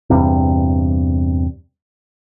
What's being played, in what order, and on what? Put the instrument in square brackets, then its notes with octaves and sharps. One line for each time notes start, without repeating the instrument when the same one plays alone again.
[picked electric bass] E2 G2 C3